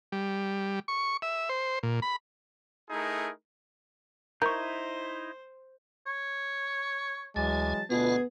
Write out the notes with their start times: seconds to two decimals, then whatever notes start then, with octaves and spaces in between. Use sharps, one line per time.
0.12 G3
0.88 C#6
1.22 E5
1.49 C5
1.83 A#2
2.02 B5
2.90 A3 D#4 E4 G#4 A#4
4.42 D#4 E4 A#4 C5 C#6 G6
6.07 C#5
7.36 D2 E3 F#3 G#3 G#5 A5
7.90 D2 B2 B3 F4 F#4 G#4